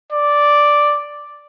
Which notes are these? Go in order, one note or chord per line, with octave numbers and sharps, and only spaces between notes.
D5